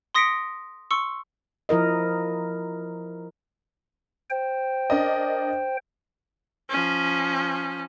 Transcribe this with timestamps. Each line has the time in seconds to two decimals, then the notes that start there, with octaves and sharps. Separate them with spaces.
0.15 C6 D#6 A#6 B6 C#7 D7
0.91 C6 C#6 E6 C#7
1.69 F3 E4 A#4 D#5
4.30 C5 G5
4.90 D4 A#4 D#5
6.69 F3 C#4